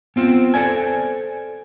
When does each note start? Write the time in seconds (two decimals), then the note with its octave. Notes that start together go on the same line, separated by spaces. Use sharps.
0.16 B3 C4 F4
0.54 A4 C5 D5 G#5